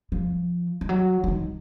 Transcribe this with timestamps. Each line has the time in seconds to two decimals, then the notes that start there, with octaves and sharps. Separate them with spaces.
0.12 F3
0.81 F3
0.89 F#3
1.24 F3
1.28 D#3